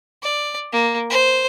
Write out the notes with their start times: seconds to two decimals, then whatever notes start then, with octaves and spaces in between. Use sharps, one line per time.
0.23 D5
0.73 A#3
1.11 C5